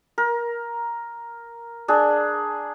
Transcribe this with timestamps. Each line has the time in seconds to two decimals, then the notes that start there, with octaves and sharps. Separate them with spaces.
0.18 A#4
1.88 D4 G#4